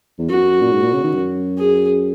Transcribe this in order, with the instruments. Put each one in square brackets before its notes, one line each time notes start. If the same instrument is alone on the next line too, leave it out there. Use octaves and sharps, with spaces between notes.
[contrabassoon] E2
[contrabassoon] F#2 [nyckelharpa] F#4
[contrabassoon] A#2
G#2
A#2
C#3
D#3
F#2
[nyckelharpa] G#4